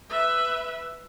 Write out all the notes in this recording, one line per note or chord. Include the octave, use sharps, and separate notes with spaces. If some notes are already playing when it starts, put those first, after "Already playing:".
B4 E5